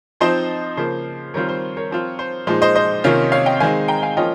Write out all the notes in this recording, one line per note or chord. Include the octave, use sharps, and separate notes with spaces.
F3 C4 D#4 C5 D#5
C#3 F3 A#3 C5
D#3 G3 C4 F4 A#4 C#5
C5
A#4 C#5
F3 C4 F4
C5
A#2 F3 G#3 D#4 C5
C5 D#5
C5 D#5
C3 D#3 A#3 C#4 F4
C#5 F5
D#5 G5
D#3 G#3 C4 D#4 F5 G#5
G5 A#5
F5 G#5
F3 A#3 C#4 F4 D#5 G5